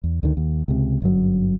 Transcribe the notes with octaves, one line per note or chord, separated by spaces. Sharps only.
E2
D2 D3 D#3
D#2
C#2 C3
G1 F#2 F#3